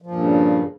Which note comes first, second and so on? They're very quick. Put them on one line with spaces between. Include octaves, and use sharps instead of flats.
F3 A#2 G2 C#3